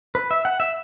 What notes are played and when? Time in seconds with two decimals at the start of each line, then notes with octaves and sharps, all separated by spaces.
0.15 B4
0.31 E5
0.45 F#5
0.60 E5